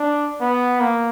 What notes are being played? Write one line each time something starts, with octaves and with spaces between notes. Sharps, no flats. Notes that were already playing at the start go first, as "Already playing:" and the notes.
Already playing: D4
B3
A#3